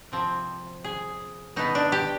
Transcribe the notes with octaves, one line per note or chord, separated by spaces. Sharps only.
C3 F3 C4
G#4
B2 B3 D#4
D4
G4